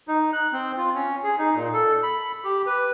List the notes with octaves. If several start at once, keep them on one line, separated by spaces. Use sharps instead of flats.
D#4
F#6
C4
F4
C#4
G#4
D#4
A#2
A4
B5
G4
B4